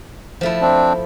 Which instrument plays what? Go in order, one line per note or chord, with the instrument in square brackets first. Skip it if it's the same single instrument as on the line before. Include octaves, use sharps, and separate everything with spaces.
[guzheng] F3 A3 E4
[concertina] C4 D4